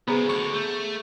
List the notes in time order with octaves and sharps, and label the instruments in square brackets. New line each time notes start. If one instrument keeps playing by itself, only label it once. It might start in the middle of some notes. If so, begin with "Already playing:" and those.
[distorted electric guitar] B1 C#3 [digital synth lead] B3 [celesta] G#4 C5 A#5
[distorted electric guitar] D2 D3 [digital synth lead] C#6
[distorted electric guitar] A3 [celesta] G#4 G6